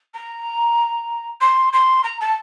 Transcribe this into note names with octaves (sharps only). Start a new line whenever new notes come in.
A#5
C6
C6
A#5
A5